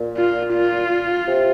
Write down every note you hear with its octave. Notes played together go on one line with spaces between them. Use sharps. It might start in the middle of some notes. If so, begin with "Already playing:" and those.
Already playing: A#2
F4
F4
C3